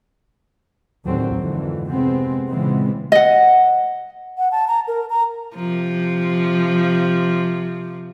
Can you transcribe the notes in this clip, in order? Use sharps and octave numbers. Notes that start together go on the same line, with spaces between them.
D#2 A2 D3 D#3 F#3 C4
G#1 F2 D3 E3
C3 G#3 B3 C4
A#2 C#3 E3 G#3 B3 C4
D#5 F#5
F#5
A5
A#5
A#4
A#5
C3 F3